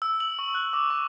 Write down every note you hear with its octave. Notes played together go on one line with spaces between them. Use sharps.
E6
F#7
C#6
F#6
D6
C#6